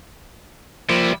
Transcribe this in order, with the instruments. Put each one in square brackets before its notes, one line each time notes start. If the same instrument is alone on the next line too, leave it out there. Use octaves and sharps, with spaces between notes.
[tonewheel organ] F3 A#3 C5 [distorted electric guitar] G3 E4